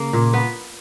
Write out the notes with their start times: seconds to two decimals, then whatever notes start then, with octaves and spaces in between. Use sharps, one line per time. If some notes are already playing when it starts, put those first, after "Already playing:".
Already playing: C#3 A#3
0.13 A#2
0.33 B3